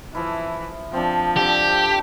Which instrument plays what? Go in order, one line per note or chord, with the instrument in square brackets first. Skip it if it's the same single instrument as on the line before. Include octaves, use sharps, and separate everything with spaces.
[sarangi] E3 [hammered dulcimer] F3 E4
[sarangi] F3 [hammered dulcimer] C4 D4
[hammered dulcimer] D3 C4 D4 [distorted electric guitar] G4